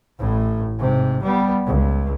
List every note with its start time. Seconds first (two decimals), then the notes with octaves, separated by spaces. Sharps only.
0.19 A1 A2
0.79 G#2 C3
1.23 G3 B3
1.66 C#2